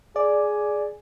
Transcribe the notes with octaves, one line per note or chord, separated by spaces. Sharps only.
G#4 D5